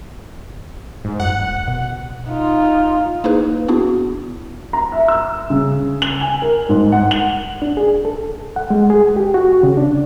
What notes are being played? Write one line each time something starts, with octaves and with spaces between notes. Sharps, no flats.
G#2
F#2 F#5
D#1
B2
D#4 F4
A#3 D#4 E4 G#4 B4
B3 D4 E4 F#4 G#4
A#5
E5
E6
C#3
F#7
G#5
A#4
G#2
F#5
F#7
D4
G#4
A4
F#5
G#3
G#4
G4
F#4
C#3
D4